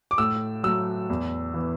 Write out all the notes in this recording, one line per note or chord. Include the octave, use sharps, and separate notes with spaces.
D6
A2 E6
F#3 A3 E6
E2
E3 B3